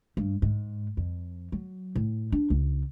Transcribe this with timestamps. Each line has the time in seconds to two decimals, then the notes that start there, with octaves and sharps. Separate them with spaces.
0.17 G2
0.42 G#2
0.97 F2
1.52 F#3
1.96 A2
2.32 D4
2.50 C#2